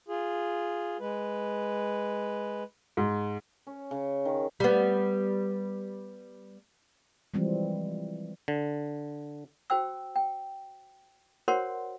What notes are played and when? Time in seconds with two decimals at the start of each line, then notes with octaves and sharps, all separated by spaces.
0.08 F4 G#4
1.00 G#3 B4
2.97 G#2
3.67 C#4
3.91 C#3
4.25 D#3
4.60 G3 B3
7.34 E3 F3 G3 G#3 C4
8.48 D3
9.70 F#4 C5 G5 E6
10.16 G5
11.48 F#4 A#4 C5 C#5 F#5 C6